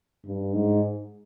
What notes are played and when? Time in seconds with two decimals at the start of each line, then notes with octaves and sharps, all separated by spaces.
0.24 G2
0.53 G#2